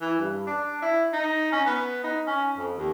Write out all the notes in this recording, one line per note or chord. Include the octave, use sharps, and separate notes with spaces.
E3
G2
D4
E4
D#4
C#4
B3
D#4
C#4
F2
D#2